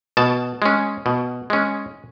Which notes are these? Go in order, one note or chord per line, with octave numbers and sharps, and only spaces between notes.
B2 A5
G#3 C#4
B2
G#3 C#4